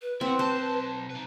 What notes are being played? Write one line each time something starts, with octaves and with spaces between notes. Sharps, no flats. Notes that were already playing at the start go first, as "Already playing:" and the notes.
B4
C4 E4 F#5
B1 C5 A5
D#4 B4